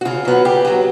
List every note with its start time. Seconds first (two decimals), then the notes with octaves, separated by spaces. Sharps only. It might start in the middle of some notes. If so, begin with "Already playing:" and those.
0.01 F#4
0.05 C#3 F4
0.25 F#3 B3
0.45 C#3 G4
0.65 F#3 B3